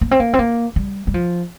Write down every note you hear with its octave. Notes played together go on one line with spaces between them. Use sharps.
A#3
C4
A#3
C4
A#3
G3
G3
F3